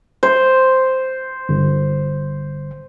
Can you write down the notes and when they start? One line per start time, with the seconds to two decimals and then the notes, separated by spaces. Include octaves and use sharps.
0.23 C5
1.49 G1